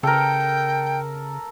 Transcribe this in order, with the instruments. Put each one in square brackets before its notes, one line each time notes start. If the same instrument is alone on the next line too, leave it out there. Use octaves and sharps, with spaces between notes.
[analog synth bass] C#3 [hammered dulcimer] A4 A#4 [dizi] G5